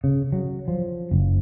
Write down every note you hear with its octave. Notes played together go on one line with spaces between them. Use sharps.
C#3
F#3
F3
F#1